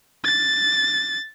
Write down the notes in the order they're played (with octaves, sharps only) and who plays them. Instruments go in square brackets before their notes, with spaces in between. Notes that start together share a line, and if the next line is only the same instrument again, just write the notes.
[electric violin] A6